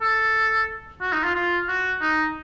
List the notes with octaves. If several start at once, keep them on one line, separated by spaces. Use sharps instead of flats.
A4
F#4
D#4
F4
F4
F#4
D#4